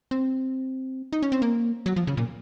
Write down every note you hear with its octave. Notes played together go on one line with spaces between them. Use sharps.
C4
D#4
C#4
C4
A#3
F#3
F3
C#3
A#2